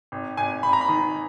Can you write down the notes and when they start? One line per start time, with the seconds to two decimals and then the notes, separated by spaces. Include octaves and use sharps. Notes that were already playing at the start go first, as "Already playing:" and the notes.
0.12 G#1
0.37 G#1 G#5
0.63 G#1 B5
0.73 A#5
0.81 B5
0.89 D#3